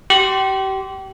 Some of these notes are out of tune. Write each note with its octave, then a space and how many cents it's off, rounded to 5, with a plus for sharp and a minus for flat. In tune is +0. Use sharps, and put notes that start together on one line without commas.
G4 -35 C6 +0